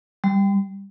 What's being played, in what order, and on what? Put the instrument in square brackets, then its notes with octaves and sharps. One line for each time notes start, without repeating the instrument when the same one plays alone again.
[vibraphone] G3